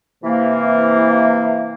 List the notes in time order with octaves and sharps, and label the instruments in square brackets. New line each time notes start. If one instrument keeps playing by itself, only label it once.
[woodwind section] C3 E3 A#3